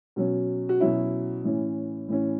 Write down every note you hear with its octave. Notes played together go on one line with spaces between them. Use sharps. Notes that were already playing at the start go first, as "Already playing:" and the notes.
B2 F#3 C#4
F#4
B2 F#3 C#4 E4
A2 E3 C#4
A2 E3 C#4